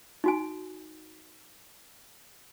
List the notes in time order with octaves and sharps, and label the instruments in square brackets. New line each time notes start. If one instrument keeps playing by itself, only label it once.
[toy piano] D#4 F#4 G#5